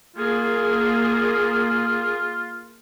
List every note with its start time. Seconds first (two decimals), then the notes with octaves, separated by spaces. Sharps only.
0.16 A#3 F4 G#4